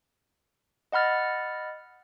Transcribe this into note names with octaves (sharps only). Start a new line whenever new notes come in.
D#5 F#5 B5 F6 A6